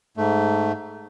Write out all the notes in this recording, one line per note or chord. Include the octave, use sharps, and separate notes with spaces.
G#2 A3